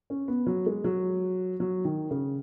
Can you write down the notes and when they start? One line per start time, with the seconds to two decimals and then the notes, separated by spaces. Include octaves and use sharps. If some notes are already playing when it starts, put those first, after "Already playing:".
0.10 C#4
0.28 B3
0.47 F#3
0.66 G#3
0.84 F#3
1.60 F#3
1.85 D#3
2.11 C#3